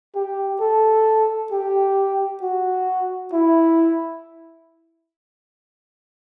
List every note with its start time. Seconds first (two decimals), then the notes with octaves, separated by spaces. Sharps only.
0.15 G4
0.60 A4
1.52 G4
2.42 F#4
3.33 E4